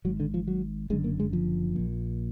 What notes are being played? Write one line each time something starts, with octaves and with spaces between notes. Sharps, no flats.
G#1 G#2 F#3
D3
F3
F#3
F#1 F#2 D3 G#3
A#3
G#3
F3
A#1 A#2